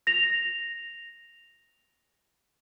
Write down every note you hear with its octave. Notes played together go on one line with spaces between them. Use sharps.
A#6 F7